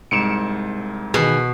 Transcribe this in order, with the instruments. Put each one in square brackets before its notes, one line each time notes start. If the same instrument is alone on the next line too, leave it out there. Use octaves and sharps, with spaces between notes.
[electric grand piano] C2 G#2 [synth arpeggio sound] C#7 D7 E7
[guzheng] B2 [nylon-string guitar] D#3 E3 G#4